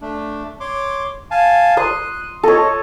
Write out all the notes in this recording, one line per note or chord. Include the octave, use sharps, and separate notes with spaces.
A3 D4
C#5 C6 D6
F5 G#5 A5
C6 D#6 F#6
A4 C#5 D#5